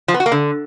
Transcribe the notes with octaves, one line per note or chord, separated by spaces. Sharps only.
F3
B3
F#4
A#3
D3